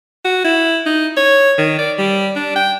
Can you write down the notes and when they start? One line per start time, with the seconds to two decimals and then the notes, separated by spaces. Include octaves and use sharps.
0.25 F#4
0.45 E4
0.86 D#4
1.17 C#5
1.58 D#3
1.79 D5
1.99 G3
2.36 D4
2.56 G5